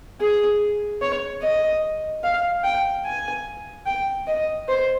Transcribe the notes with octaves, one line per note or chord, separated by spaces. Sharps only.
G#4
C#5
D#5
F5
G5
G#5
G5
D#5
C5